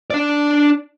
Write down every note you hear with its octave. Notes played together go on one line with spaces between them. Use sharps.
D4 D5